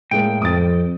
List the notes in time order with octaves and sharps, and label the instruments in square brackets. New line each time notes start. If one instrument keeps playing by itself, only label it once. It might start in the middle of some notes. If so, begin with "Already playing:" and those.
[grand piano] A2 G#3 A#3 [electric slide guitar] G5
[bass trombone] F2 [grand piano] D#6 A6